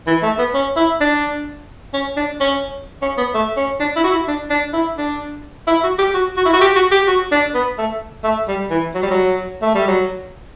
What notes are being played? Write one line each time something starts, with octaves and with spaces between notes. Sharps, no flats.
E3
A3
B3
C#4
E4
D4
C#4
D4
C#4
C#4
B3
A3
C#4
D4
E4
F#4
E4
D4
D4
E4
D4
E4
F#4
G4
F#4
F#4
E4
F#4
G4
F#4
G4
F#4
D4
B3
A3
A3
G3
E3
F#3
G3
F#3
A3
G3
F#3